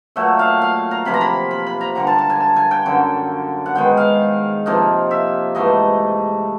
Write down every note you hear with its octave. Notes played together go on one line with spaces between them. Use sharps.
A#2 F#3 A3 E5
F5
F5
A#5
C3 F3 A#3 B5
A#5
B5
B5
B5
A#5
D3 G3 A#3 A#5
A5
A5
G#5
A5
G#5
G5
F#2 D3 F#3
F#5
G#2 D#3 G#3 B3 G5
F5
C3 F3 A#3 D#4
E5
G#2 E3 A3 D#5